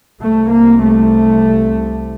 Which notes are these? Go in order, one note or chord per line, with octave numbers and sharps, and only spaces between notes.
C2 C3 A3
A#3
A3